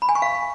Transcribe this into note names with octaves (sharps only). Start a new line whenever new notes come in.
B5
G#5
C#6
F5